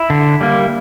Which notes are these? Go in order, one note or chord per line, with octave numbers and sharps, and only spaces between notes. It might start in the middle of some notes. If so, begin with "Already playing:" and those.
Already playing: E4
D3
G3 A#3